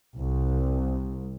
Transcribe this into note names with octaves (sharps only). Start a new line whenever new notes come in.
C2